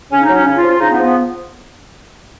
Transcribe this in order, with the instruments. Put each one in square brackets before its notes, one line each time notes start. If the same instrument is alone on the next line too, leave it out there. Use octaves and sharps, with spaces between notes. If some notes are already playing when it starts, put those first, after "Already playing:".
[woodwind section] C#3 C#4
D#4
F#3
C#4
C#3 C#4
F4
F3
F4
C#3 D#4
B3
F3
B3